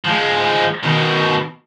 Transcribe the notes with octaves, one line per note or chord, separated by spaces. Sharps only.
F3 G#3
B2 D#3